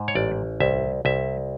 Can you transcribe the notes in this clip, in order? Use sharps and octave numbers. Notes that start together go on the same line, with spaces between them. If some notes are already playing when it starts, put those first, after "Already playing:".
Already playing: G#2
C#5
A1 D5
C2 E5
C2 E5